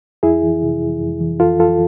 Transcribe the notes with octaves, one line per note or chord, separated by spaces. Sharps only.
F2 E4 G#4
E3
C3
F2
F2
E3
F2 F4 A4
F2 F4 A4